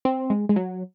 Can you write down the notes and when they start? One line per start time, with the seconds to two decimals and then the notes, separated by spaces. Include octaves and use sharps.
0.05 C4
0.30 G#3
0.49 G#3
0.56 F#3